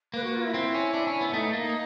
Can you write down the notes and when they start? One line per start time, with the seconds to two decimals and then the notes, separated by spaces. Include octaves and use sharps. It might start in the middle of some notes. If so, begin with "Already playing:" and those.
0.14 A#3 B4
0.23 F#4
0.34 F4
0.44 E4
0.54 C4
0.74 C#4
0.94 D4
1.07 C#4
1.21 B3
1.33 A3 D#4
1.53 A#3
1.61 D#4